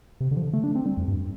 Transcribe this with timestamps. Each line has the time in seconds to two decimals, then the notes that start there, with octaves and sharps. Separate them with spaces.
0.20 C3
0.31 D3
0.37 F3
0.42 D3
0.53 A3
0.64 D4
0.75 C4
0.86 G3
0.97 F2
1.08 G2